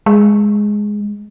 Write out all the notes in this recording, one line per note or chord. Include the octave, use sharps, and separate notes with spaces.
G#3